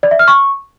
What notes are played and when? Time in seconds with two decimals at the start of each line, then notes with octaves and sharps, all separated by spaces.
0.03 D5
0.11 E5
0.19 F6
0.28 C#6